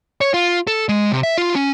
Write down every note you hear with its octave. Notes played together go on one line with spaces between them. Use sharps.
C#5
F4
A4
G#3
C3
E5
F4
C#4